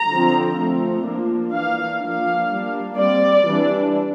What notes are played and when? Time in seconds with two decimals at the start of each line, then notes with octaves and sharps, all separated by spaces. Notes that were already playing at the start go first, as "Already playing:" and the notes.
Already playing: A#5
0.09 D3 F3 C4
0.57 F3 A3 C4
1.05 F3 A#3 D4
1.53 E3 A#3 D4 F5
2.01 F3 A#3 D4 F5
2.50 G3 A#3 D4
2.98 G3 C4 D5
3.47 E3 G3 D4